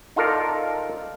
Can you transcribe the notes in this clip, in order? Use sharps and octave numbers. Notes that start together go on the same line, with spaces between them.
D#4 F4 A4 A#4 D5